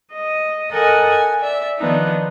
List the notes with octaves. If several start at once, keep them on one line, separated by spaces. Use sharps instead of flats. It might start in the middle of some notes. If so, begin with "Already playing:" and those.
D#5
A4 A#4 D#5 F#5 G#5
G#5
D5 E5
D#3 F3 B3 D4 D#4